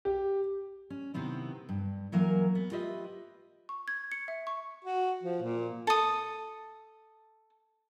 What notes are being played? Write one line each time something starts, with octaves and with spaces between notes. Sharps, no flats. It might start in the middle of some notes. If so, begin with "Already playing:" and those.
G4
C#4
C3 D#3 B3 C4 E4
G2
E3 F#3 A#3 A#4 F5 G#5
B3
F4 G4 B4 D#5 E5
C#6
G#6
C#7
E5
C#6
F#4
F3
A#2
A4 D#6